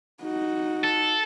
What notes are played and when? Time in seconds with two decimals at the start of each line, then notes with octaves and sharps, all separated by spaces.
0.23 D#4 F#4
0.84 A4